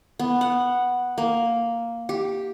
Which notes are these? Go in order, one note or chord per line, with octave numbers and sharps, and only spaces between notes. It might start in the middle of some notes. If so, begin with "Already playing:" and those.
B3
F#5
A#3
G4